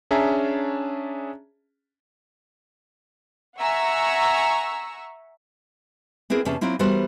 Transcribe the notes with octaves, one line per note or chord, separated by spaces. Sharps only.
C#4 D4 G#4 E5 A5 A#5
E5 F#5 G#5 A#5 C#6 E6
B3 C4 E4 G#4 A#4
E2 C3 C#4 A5
F#3 A#3 C4 E4 F4
E3 G3 B3 F#4 A#4 C5